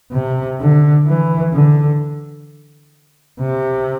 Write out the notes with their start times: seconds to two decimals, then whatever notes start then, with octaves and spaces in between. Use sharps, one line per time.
0.13 C3
0.61 D3
1.07 E3
1.54 D3
3.40 C3